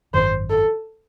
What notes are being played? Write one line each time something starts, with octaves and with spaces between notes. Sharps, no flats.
G#1 F#2 D#3 C5
A4